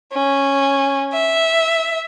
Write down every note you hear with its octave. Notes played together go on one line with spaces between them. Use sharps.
C#4
E5